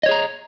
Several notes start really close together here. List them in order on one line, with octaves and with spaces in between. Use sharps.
D#5 C#5 G#4 A#5